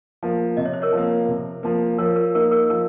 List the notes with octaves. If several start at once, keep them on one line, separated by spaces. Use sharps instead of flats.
F3 A#3
C3 D#5
C#5
C5
A#4 C#5
F3 A#3
C3
F3 A#3
F3 A#4 C#5
A#4
A#3 D#4 A#4
A#4
F3 A#4